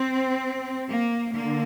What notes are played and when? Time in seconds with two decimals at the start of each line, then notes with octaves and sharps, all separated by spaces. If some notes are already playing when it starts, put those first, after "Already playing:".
Already playing: C4
0.89 A#3
1.33 D3 A#3